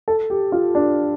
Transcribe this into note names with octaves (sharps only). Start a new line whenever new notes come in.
A4
G4
F4
D4